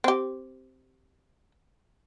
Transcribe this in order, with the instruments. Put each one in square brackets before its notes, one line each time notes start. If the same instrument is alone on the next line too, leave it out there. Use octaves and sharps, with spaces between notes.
[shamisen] C4 G4